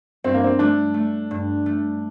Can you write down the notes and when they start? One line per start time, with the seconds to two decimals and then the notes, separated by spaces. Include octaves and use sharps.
0.24 G2 C4
0.34 A#3
0.44 C4
0.59 A3 D4
0.94 A3
1.31 G2
1.66 A3